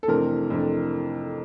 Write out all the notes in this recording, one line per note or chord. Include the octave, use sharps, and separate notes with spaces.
A4
F2 C3 E3 A3 D4 A#4
F2 C3 E3 A3 D4